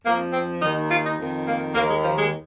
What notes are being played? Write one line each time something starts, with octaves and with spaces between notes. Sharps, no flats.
F2 F3 A#3
C4
D#2 D#3 D#4
F4
D#4
F2 D#3
A#3
D#2 D#3 A#3
G#3
F3
G#3